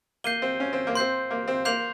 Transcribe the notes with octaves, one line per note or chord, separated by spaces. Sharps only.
A#3 G6 C7 D#7 G7
C4
C#4
C4
A#3
C4 C6 G6 C7
A#3
C4
A#3 C6 G6 C7 F7